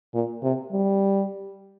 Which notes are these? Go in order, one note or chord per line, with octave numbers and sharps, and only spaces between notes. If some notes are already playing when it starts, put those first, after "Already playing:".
A#2
C3
G3